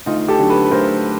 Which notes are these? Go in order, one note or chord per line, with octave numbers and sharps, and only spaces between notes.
D2 D#4 F4
G4 A4
D3 F#3
A4 B4
B4
D2 A#4 C5